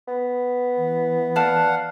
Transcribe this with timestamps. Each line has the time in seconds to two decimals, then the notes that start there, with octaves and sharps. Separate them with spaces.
0.08 B3
0.77 E3
1.36 D5 F5 F#5 A5